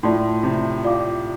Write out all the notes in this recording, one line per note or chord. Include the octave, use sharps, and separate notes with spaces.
A2 F4 D5 A5 C6
C3
F4 D5 F5 D6